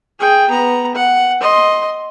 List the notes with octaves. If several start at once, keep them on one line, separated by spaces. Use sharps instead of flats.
G#4 G5
B3 A#5
F#5
D#5 C6